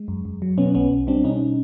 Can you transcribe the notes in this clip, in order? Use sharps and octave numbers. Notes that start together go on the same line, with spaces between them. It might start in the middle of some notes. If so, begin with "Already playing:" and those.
Already playing: G#3
F#2
F#2
F#3
B2 B3 C#4
B1 B3 C#4
B1
G3 C4 D4
B2 C#4 D#4